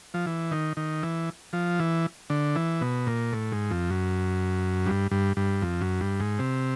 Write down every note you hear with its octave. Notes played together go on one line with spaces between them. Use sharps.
F3
E3
D#3
D#3
E3
F3
E3
D3
E3
B2
A#2
A2
G#2
F2
F#2
G2
G2
G2
F2
F#2
G2
G#2
C3